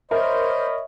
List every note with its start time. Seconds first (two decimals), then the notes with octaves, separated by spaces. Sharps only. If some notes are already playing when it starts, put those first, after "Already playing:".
0.11 A#4 C5 C#5 D#5 E5 B5